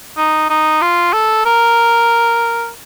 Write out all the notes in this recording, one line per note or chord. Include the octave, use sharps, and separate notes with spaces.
D#4
D#4
F4
A4
A#4